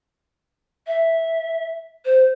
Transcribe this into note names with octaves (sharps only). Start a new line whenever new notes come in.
E5
C5